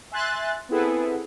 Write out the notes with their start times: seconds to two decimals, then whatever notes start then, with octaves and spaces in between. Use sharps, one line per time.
0.11 E5 G#5 C6 F#6 A6
0.69 B3 C4 E4 G#4 A4 B4